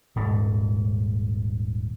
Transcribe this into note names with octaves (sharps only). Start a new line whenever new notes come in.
D#1 G#2